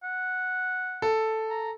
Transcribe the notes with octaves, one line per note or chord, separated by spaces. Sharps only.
F#5
A4
A#5